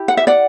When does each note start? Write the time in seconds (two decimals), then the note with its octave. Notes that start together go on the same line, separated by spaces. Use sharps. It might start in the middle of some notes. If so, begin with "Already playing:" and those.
Already playing: E4 G4
0.08 F#5
0.17 E5
0.27 D5 F#5